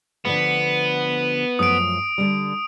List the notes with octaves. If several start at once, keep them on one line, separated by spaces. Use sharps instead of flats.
D3 F3 A3 B3
F#2 F3 A3 D#6 D7
D3 G3